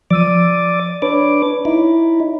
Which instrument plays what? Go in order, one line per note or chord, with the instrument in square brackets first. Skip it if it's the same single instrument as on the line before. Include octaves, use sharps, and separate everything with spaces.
[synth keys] F3 E6 D#7 [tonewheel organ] D5 D6
[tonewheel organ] D4 B4 D6 [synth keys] C#5
[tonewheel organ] D#4 E4